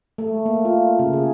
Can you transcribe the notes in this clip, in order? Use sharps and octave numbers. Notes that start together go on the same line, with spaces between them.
A3
A#3
F4
C#3
G#4